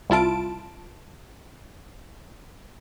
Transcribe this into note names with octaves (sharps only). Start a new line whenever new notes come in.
C2 E4 F4 A5 D7